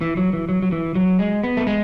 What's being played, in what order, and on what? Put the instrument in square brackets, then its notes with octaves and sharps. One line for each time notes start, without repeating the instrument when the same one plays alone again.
[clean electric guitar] E3
F#3
E3
F#3
F#3
E3
F#3
G#3
B3
A3
G#3